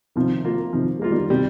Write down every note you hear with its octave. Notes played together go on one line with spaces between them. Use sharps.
C3 D#3 F3
A#3 F4
C3 D#3 F3
G#3 A#3 F4
D#3 G3
C3 D#3 G3